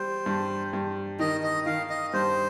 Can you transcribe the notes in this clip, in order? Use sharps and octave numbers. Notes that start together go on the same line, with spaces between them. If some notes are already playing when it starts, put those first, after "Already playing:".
Already playing: G3 C5
G2
G2
D#3 D#5
D#5
D#3 F5
D#5
G2 C5